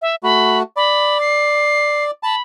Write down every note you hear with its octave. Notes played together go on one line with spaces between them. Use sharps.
E5
A3 F#4 B5
D5 B5
C7
A5 B5